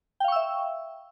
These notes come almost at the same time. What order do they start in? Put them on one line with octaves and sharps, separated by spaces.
G5 F5 C#6 E6 E5